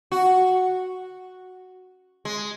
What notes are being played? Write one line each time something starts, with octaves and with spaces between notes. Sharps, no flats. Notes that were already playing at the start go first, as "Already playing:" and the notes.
F#4
G#3